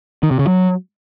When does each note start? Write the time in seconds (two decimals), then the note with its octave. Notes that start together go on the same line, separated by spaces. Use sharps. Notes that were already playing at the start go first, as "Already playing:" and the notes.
0.23 D#3
0.31 C3
0.39 C#3
0.47 F#3